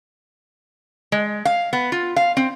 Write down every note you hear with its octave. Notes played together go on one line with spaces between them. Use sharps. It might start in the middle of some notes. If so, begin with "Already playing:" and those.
G#3
F5
B3
F4
F5
C4